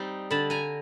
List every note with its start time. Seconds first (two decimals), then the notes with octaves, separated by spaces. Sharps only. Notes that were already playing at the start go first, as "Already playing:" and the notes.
Already playing: G3 C4 D#4
0.30 D3 A5 B5
0.50 G#5 A#5